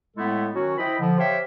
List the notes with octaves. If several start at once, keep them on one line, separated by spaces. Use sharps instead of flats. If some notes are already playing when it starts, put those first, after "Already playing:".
A2 G#3 A3 B3 E4 A4
D#3 F#3 C#4 F#4
E4 C5 D#5 G5 B5
D3 F3
G4 C5 C#5 E5 F5 G5